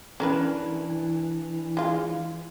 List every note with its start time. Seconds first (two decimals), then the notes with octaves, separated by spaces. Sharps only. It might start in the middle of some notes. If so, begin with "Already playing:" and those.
0.20 E3 C#4 D4 A#4 B4
1.77 G#3 F4